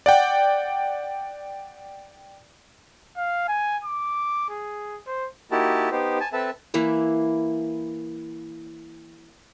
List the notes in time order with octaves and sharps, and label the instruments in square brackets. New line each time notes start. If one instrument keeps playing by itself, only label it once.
[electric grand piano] D5 F#5 G5
[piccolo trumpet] F5
G#5
D6
G#4
C5
[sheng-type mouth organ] A#3 D#4 E4 F#4 G4 A5
B3 D#4 G4 C5
G#5 A5
C4 A4 B4 E5 A5
[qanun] E3 A#3 E4